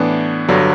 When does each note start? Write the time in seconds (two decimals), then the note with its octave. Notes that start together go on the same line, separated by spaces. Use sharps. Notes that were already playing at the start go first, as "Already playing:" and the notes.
Already playing: A2 E3 B3 D4
0.48 G1 G2 D3 F#3